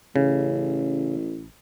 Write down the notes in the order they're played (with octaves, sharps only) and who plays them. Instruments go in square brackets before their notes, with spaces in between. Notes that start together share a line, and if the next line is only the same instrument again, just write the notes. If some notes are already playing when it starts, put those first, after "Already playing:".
[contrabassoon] A1 [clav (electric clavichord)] C#3